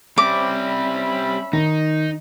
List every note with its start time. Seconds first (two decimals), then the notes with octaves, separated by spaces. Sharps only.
0.18 G3 C4 C#4 E5 B5 D6
1.53 D#3 D#4